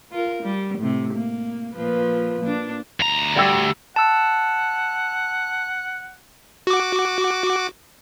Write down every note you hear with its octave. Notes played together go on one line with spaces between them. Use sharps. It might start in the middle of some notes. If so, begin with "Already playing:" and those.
F4 A#4
G3
A2 C3
A#3
A#2 F3 B4
A#2 D4
D2 A#5
D2 G3 G4 E6
F#5 A5 E6
F#4 D6